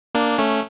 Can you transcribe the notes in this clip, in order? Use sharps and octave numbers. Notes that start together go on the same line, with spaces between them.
A#3 D4
A3 C#4